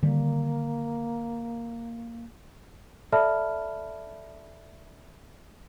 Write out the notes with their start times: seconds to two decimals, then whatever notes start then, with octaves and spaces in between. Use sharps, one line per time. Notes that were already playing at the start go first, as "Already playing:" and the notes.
0.03 D3 D#3 G3 A#3
3.12 A4 D5 E5 A5 B5 F6